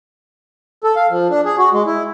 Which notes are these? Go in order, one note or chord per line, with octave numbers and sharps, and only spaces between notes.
A4
F5
F3
D4
G#4
F#4
G#3
E4